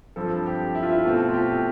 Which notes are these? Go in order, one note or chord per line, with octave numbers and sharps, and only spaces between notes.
G2 F3 C4 A4
G4
E4
F4
E4
B2 A3 C4 F4
F4
G4